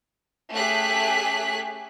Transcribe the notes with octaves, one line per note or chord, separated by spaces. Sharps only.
A3 C#4 G4 G#4 F#6 B6